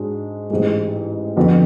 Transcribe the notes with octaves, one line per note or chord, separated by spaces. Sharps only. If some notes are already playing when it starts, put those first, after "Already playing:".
Already playing: G#2 G#3 D4 F#4
A1 G#2 G#3
F2 D3 F3 B3 F#4